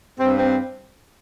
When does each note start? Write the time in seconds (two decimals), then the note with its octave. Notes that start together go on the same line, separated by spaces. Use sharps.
0.19 G2 C4
0.38 C4